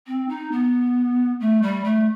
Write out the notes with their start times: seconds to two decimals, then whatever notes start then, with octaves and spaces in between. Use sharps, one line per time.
0.07 C4
0.29 D#4
0.52 B3
1.40 A3
1.62 G3
1.84 A3